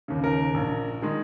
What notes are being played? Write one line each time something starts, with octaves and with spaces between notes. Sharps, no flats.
D#2 C#3
A#4
A#1
D#3 G#3